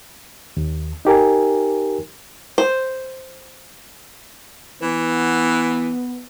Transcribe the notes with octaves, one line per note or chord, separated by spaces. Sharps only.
D#2
D#4 G4 A#4 G#5
C5
E3 B3 B4